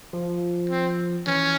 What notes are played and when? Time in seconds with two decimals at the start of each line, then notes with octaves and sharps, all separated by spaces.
0.13 F3
0.70 C4
1.27 E3 C#4